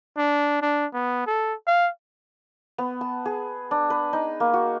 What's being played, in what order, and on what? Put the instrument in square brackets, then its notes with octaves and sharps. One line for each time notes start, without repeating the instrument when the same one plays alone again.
[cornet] D4
D4
B3
A4
F5
[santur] B3
A5
G#4
D4
B4
D#4
A#3
F#4